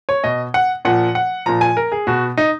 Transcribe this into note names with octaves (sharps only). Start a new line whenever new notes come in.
C#5
B2 D#5
F#5
A#2 F3 F#5
F#5
A#2 F3 A#5
G#5
A#4
G#4
B2 F#4
D#4